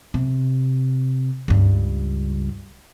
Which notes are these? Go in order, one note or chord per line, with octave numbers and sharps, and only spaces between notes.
C3
C#2 G2